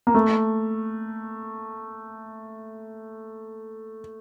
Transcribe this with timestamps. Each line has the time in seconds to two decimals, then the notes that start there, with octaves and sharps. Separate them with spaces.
0.07 A#3
0.15 A3